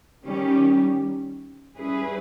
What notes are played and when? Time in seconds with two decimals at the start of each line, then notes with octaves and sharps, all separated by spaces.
0.25 D#3 G3 C#4 G4
1.77 G3 C#4 E4 G#4 B4